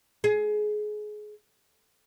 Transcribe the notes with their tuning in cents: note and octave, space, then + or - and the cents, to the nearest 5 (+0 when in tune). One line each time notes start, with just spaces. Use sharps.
G#4 +25